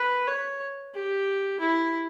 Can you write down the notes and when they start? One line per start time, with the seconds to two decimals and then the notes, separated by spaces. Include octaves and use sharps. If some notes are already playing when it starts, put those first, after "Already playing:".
Already playing: B4
0.27 C#5
0.94 G4
1.60 E4